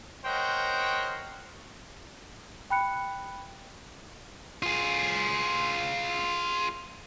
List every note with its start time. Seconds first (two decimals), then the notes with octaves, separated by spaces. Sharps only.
0.24 A#4 C5 C#5 D#5 F#5 G5
2.70 G5 B5 F#6 C#7
4.63 F4 G#4